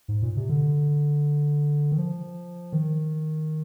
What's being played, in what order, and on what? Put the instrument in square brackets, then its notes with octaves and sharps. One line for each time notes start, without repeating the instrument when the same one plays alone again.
[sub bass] G#2
A#2
C3
D3
D#3
F3
D#3